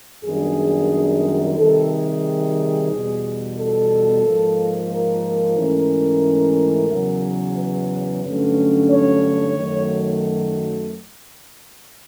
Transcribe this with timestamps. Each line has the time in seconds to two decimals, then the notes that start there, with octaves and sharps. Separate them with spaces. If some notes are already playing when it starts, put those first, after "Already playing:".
0.24 F#2 D#3 G3 B3 D4 G#4
1.57 C3 D#3 G3 A4
1.91 G#4
2.91 E2 B2 G3
3.57 A4
4.23 G#2 F3 A#3
4.90 A#4
5.57 G#2 E3 A3 C#4
6.90 E2 C#3 F#3
7.57 B4
8.24 G2 D3 F#3 A3 C#4
8.91 C#5
9.56 F#2 D#3 F#3 A3